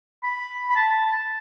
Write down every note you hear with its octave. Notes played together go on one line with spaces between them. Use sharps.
B5
B5
A5